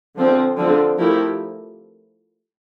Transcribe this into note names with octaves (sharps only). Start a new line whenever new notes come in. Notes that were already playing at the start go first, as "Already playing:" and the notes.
D3 F3 C4
D3 F3 C4
F3 A3 E4 G4 A#4